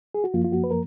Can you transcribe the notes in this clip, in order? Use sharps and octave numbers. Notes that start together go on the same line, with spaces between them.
G#4
F#4
F#2 F3 A#3 F4
F4
F#4
B4
A#4